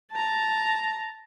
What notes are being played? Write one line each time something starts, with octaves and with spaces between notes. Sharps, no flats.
A5 A#5